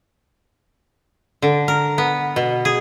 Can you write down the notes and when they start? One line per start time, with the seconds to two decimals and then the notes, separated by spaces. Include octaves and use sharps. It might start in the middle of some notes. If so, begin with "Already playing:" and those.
1.42 D3
1.68 A#4
1.98 B3
2.36 B2
2.65 G#4